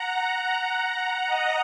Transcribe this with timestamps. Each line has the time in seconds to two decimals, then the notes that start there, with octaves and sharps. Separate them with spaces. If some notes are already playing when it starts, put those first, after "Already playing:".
Already playing: F#5 A#5
0.20 F#5 A#5
0.56 F#5 A#5
1.26 D#5 F#5